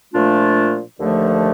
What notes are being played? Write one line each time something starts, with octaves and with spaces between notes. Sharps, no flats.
A#2 F3 A3 D4 F4
D#2 D3 F3 A3